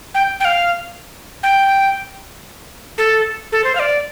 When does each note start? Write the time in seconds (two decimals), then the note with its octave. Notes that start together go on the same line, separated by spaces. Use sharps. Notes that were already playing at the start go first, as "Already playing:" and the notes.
0.15 G5
0.40 G5
0.45 F5
1.43 G5
2.98 A4
3.52 A4
3.64 C5
3.75 F5
3.79 D5